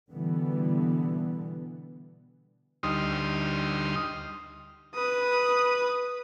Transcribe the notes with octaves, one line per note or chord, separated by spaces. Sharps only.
B2 D3 E3 G3 B3
D2 G3 D#4 C6 D#6 F6
B4 D#6